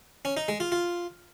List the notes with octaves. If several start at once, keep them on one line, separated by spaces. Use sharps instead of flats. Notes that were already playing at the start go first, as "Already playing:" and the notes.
C#4
D#4
G#3
F4
F4